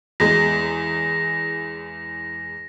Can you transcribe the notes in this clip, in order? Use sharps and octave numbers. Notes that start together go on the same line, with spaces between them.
E2 G#3 A#6